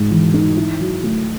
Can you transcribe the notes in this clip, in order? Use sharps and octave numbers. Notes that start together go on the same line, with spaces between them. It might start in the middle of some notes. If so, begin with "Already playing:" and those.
Already playing: G#2 G#3
E3
D#4
E4
F#3
A3